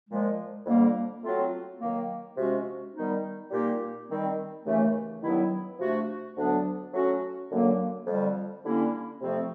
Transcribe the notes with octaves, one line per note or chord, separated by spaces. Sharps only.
A#2 F3 G#3
F2 D3 G3 A#3
F#3 A3 C4 F4
D#3 F#3 A#3
C3 F3 G#3 C#4 F#4
D#3 G3 B3 D#4
A#2 G3 A#3 D#4 G4
D#3 G3 C4
D#2 C#3 E3 A3
G2 D#3 F#3 B3 E4
C3 F3 A3 D4 F#4
D2 D3 F#3 B3 D4
F#3 A3 C#4 F#4
F#2 D3 F#3 A#3
F2 D3 G3
D3 G3 A#3 C#4 E4
F2 C3 F3 A3 C4